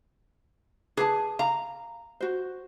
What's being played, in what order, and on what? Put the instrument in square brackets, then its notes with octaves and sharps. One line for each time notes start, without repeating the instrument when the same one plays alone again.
[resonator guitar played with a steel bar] G#4 [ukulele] B4 A5
[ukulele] F5 [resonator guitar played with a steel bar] A#5
[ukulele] F#4 C5